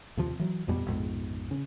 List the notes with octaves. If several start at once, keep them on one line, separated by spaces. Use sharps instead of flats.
D#2 C3 F3
E3 F#3
A1 F2 B2 G3
A#1 F2 G#2 B2
C#3